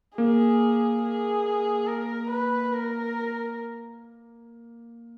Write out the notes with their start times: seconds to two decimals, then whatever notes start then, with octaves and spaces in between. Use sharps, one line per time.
0.17 A#3 G#4
1.03 G#4
1.87 A#4
2.30 B4
2.73 A#4